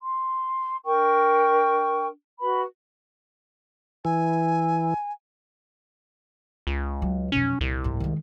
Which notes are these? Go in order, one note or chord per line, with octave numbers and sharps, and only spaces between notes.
C6
D4 A#4 G5 C#6
F#4 B4 B5
E3 G#5
C#2
F#3
B1 F2 C#4
C2 A#2
A1 G#2
D#3 G#3